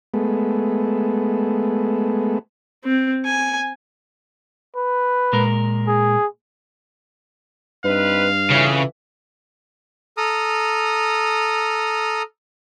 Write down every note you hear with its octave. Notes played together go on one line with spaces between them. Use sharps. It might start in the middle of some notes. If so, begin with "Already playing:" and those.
G#3 A3 B3
C4
G#5
B4
A#2 G#3 A#4
G#4
G2 C4 D#4 B4 F5
F2 C#3 E3
A4 A#5 D#6 F6